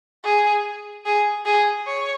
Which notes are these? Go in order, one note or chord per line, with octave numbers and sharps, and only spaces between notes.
G#4
G#4
G#4
C#5